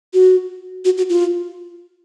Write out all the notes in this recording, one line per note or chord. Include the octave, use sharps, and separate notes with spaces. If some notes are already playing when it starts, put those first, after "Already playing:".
F#4
F#4
F#4
F4